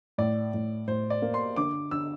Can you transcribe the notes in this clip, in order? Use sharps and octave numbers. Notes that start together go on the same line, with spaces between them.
A2 D5
A2
A2 C5
D5
A#3
C6
D3 D6
D3 E6